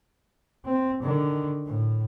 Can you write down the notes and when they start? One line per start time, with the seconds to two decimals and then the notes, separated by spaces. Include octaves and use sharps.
0.65 C4
1.02 D3 D#3
1.67 A2